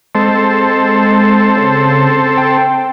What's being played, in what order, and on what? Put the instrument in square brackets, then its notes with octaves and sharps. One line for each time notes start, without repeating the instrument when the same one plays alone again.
[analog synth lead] G#3 [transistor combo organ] C4 A4
[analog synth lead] C#3
G5